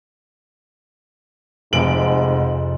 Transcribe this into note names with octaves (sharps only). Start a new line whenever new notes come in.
F1 F2 G#2 C3 D7 F#7